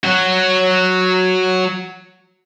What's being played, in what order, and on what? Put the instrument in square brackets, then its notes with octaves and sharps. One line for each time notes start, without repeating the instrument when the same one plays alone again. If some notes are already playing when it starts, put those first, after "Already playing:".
[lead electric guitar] F#3 F#4